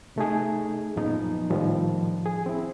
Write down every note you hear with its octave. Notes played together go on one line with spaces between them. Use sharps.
C3 A3 D#4 G#4
F#2 A#2 F3 B3 D#4
A2 D#3 F3 G3
G#4
C4 E4